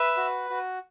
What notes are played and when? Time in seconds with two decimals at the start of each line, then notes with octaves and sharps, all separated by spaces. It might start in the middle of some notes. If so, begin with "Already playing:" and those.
Already playing: B4 E5
0.17 F#4
0.50 F#4